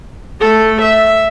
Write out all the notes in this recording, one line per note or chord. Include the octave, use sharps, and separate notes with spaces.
A3 A4
E5